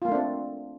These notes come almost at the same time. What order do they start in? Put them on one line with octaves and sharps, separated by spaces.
F4 A#3 A3 D4 C4